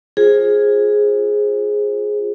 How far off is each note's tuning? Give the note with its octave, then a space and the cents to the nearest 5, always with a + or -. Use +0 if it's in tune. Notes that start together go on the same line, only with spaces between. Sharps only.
F4 +5 G#4 +0 C5 +25